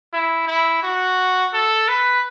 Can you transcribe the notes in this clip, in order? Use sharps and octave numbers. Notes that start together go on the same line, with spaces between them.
E4
E4
F#4
A4
B4